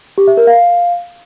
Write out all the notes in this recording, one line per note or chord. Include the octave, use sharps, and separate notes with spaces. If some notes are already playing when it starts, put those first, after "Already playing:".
G4
E5
A#4
F5